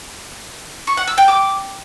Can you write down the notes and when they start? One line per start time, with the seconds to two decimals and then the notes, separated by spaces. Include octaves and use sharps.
0.87 C#6
0.97 F#5
1.07 E6
1.18 G5
1.28 D6